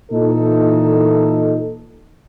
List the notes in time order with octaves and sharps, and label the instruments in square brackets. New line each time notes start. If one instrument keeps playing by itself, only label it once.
[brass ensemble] A#2 E3 D#4 A4